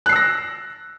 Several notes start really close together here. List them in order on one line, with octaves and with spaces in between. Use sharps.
F#6 C7 E6 A#6